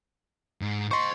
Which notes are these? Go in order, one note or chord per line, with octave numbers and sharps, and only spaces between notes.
G#2
C5 D#5 C6 C#6